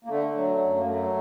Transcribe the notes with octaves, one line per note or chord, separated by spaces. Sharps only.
A#3
D3 A3
F#3
A3
F#2
A#3
F#3 A3